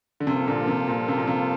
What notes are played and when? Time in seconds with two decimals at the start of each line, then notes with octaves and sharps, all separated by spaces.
0.20 D3
0.27 G2 C3 F3 A#3 F4 A4
0.47 A#2 D3
0.67 C3
0.88 A#2
1.09 C3
1.18 A#2
1.28 C3